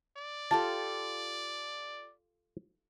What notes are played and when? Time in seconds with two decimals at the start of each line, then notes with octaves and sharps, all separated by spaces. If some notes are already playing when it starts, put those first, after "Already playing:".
0.17 D5
0.51 F4 G4 A4 A5